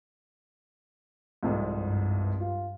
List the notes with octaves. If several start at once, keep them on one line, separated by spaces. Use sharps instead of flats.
C2 F2 G#2
G2
F4